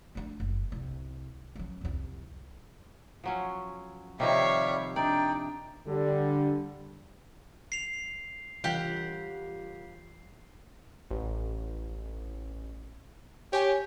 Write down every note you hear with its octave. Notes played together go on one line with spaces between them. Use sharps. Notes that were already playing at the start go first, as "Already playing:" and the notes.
A3 D4
F#1
C2
F#3 C#4
C2 F2
F3 F#3 C#4
C3 D#3 F3 G3 G4 C#5 E5 F5
D4 D#4 D5 G5
D3 G3
C7 F7
E3 G3 F4 G4 F5 F#5
A1
G4 C#5 G#5